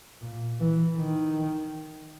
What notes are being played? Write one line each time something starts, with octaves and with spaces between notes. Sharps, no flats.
A#2
E3
D#3